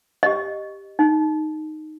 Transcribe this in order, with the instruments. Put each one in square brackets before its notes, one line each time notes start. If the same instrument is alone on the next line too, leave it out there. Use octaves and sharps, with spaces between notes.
[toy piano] G4 D#5
D#4